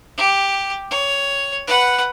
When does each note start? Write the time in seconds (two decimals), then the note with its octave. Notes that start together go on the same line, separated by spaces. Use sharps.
0.17 G4
0.91 C#5
1.67 B4 F#5